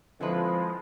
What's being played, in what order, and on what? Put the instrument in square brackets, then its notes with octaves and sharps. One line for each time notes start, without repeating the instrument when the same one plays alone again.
[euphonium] F2 [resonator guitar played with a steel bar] D3 E4 B4 [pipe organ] F3 G#3